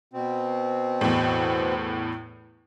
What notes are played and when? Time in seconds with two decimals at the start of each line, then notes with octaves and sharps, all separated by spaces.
0.13 B2 C4
1.01 E2 A2